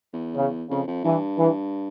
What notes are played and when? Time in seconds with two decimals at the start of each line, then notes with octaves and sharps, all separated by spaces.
0.13 E2
0.36 C#3
0.70 F2 C#3
0.87 F2
1.04 G2 E3
1.39 E3